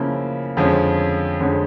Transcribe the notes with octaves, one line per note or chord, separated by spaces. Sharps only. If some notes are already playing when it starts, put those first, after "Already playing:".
Already playing: C#3 F3 A#3 C#4 E4
F2 D3 F3 G#3 C#4
F2 D3 F3 G#3 C#4